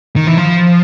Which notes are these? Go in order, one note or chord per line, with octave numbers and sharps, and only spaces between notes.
D#3
E3
F3